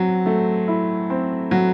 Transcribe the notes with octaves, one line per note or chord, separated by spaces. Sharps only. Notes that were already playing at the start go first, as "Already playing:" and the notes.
Already playing: F#3 C4
A3
E4
C4
F#3